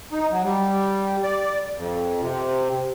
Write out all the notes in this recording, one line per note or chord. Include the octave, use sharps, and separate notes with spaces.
D#4
F#3
G3
D5
F2
C3